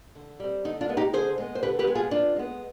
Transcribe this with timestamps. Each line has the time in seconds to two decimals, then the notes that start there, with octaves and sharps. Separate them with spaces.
0.15 D3
0.40 G3 C4
0.65 D3 D#4
0.81 D4 F4
0.89 G#3 B3
0.97 D#4 G4
1.13 D3 G#4 C5
1.38 G#3 B3
1.55 C5
1.63 D3 G4 B4
1.79 G4 B4
1.87 G#3 B3
1.95 F4 G#4
2.11 D3 D4 F4
2.36 G#3 B3